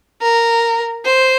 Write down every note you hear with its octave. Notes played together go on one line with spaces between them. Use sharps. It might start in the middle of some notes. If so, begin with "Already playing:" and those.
A#4
C5